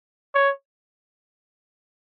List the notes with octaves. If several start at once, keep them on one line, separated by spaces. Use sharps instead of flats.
C#5